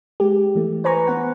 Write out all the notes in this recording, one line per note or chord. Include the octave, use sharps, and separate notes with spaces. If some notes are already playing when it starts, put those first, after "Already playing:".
G#3 G4
E3 A3
B4 C5 G#5 A#5 C#6
B3 F#5